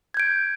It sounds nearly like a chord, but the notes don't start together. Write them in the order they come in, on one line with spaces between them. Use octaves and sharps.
G#6 G6 D7